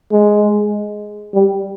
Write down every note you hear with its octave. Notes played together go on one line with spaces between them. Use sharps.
G#3
G3